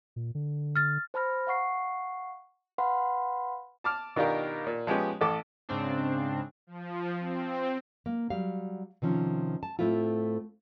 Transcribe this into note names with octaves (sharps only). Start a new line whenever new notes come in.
A#2
D3
F6 A6
C5 A5 B5 F6 A#6
F5 F#5 C#6 C7
B4 F5 F#5 B5 C6
A5 D6 F6
B2 D#3 D4 F4 G4 A#4
A#2
F3 G#3 B3 C#4 G4
A1 A4 D6
G#2 C#3 C4 D4
F3
C4
A#3
F#3 G3 F5
C3 D#3 F3 C#4
A5
A2 A3 C4 E4 F4